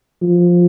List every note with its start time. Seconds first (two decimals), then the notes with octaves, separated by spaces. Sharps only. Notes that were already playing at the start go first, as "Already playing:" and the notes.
0.22 F3